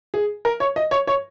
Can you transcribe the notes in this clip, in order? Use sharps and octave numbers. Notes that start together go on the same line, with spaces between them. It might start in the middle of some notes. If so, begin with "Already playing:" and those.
G#4
A#4
C#5
D#5
C#5
C#5